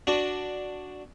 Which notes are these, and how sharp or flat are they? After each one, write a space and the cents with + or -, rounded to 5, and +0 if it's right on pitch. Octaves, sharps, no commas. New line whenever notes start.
D4 +0 F#4 +0